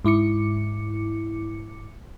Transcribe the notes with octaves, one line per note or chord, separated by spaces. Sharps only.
G#2 E4 D6 C#7